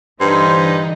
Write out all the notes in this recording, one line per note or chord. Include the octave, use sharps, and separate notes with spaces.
G2 D3 E3 D#4 C5